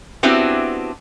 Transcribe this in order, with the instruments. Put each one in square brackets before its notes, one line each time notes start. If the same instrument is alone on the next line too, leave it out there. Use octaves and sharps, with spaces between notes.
[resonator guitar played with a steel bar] B3 C4 D4 E4 F#4 G4